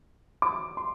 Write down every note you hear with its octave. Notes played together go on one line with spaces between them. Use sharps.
D6
C6